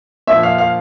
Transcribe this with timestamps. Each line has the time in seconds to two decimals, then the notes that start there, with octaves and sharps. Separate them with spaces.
0.27 A#2 F3 E5
0.43 F5
0.58 F5